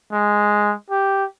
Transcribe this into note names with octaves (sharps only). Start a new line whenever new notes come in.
G#3
G4